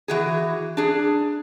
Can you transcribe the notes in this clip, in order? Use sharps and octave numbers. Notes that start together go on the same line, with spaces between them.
E3 F#4 G#4
D4 G#4